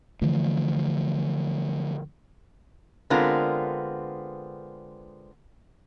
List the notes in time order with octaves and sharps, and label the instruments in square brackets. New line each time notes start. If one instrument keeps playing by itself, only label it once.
[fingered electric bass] D3 E3 F3 A3
[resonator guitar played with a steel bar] D3 G#3 B3 C4 F4 A#4